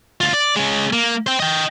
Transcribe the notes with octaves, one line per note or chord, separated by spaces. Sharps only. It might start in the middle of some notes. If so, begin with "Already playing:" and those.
D2 F4
D5
G#3 C#4
A#3
C5 G5
D#5 G5